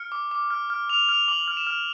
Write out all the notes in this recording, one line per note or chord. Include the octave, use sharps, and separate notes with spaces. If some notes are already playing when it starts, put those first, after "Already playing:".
Already playing: F6 C#7
D6
D6
F6
F6
F6 F7
F6 F7
D6 F#7
F6
E7
F6